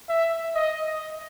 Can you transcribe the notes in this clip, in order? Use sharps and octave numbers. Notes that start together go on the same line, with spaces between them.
E5
D#5